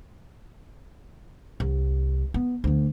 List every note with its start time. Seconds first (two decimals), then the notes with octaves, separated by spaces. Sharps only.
1.60 C2
2.34 B3
2.64 D2 A3